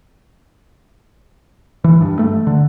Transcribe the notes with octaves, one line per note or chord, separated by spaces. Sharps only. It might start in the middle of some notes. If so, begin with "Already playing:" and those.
E3
G2
A3
D3